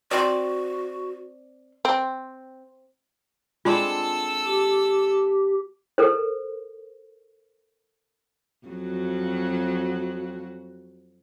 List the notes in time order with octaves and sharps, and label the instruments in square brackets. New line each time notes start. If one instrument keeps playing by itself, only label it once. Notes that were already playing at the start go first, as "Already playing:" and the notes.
[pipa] C4 D5 [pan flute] F#4
[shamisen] C4
[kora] G#3 C4 D4 [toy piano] F4 [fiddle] A4 E6
[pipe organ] G4
[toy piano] A4 A#4 C5
[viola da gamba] F2 F#3 F#4